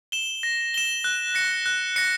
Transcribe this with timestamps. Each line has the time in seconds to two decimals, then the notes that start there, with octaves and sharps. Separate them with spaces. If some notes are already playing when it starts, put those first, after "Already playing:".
0.12 E7 G7
0.43 A#6
0.74 E7 G7
1.04 F#6
1.35 A#6 C#7
1.66 F#6
1.96 A#6 C#7